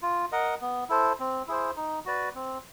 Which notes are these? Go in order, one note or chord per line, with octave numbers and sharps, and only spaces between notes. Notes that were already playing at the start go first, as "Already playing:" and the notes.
F4
A#4 D#5 F#5
B3
E4 A4 C5
C4
E4 G#4 C5
D#4
F#4 B4 D5
C4